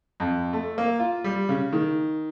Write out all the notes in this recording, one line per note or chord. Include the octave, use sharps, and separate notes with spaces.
F2
A3
A#3
F4
G3
C#3
D#3